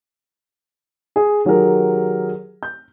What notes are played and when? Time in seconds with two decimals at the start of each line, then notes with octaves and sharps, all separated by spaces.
1.16 G#4
1.45 D#3 F#3 G4 G#4 A#4
2.63 G6